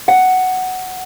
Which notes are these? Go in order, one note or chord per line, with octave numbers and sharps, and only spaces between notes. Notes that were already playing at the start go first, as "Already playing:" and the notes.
F#5